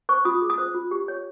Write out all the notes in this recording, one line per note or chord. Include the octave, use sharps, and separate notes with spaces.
C5 C#6
F4 D#6
G#4
D#6
C5
F4
G4
C#5